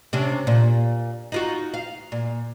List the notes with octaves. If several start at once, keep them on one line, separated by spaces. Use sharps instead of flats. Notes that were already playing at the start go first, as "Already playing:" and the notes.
C3 C#4 D4
A#2
D#4 F4 F#4
F5
A#2